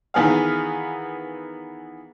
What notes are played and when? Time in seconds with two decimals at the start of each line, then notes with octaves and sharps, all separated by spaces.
0.14 D#3 E3 B3 G#4 F5